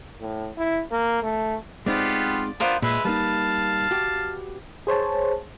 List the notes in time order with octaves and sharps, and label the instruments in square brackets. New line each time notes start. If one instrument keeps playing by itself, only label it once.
[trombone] A2
E4
A#3
A3
[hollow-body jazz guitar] G#3 C4 D#4 [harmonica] B3 F4 G4 [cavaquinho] D5
[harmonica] B3 D4 [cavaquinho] F4 A#4 C5
[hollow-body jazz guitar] A#2 [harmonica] G#3 E5 [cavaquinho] B4
[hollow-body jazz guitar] G3 A#3 D#4 [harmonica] F5 A5
[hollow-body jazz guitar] F#4 G4
[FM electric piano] G#4 C5 C#5 A5